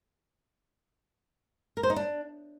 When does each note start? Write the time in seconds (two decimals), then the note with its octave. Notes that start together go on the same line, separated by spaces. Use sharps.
1.77 A#4
1.83 C5
1.90 D#4
1.96 D4